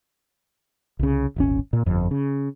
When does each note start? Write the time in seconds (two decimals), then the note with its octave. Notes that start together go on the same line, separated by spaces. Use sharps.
0.99 C2 C#3
1.36 D#1 G#1 C#4
1.73 A#2
1.86 G1 F2
2.11 C#3